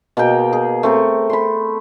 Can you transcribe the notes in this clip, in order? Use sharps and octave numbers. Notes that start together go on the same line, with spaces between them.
B2 A#3 G#4 G5
G#4
A3 C4 A#4
B5 C6